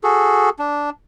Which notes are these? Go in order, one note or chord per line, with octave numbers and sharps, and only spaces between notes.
F#4 G#4 A4
D4